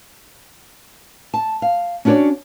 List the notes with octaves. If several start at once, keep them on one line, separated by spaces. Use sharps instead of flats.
A5
F5
C#4 D4 F#4 A#4 C#5 D5